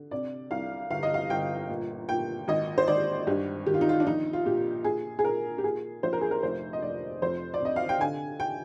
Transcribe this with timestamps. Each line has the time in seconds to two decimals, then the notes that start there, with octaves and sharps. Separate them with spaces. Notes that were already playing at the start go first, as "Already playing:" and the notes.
Already playing: D3
0.11 C3 D5
0.51 C2 F5
0.90 G1 F5
1.03 D#5
1.14 F5
1.30 G1 G5
1.69 A#2
2.09 A#2 G5
2.48 G#1 D#5
2.78 C5
2.88 G#1 D5
3.27 G2 G4
3.66 D#3 G4
3.74 F4
3.81 D#4
3.89 F4
4.00 D4
4.06 A#1 D#4
4.33 F4
4.45 A#2 G4
4.84 A#2 G#4
5.19 G#4
5.25 A#2 A#4
5.58 G4
5.64 A#2 G#4
6.03 A#1 C5
6.13 A#4
6.21 G#4
6.31 A#4
6.43 F1 C5
6.73 D#5
6.82 F1 D5
7.22 F2 C5
7.54 D5
7.60 C3 D#5
7.76 F5
7.89 G5
8.00 D3 G#5
8.40 G5